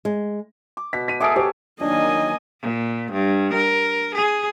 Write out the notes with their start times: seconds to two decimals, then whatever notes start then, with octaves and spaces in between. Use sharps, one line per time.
0.05 G#3
0.77 D6
0.93 B2 B6
1.08 B6 D#7
1.20 G#4 A4 E5 D6 D#6 D7
1.36 G4 C5 C#5
1.81 D#3 F#3 A#3 D4 D#5 G#5
2.61 A#2
3.12 G2
3.53 A#4
4.15 G#4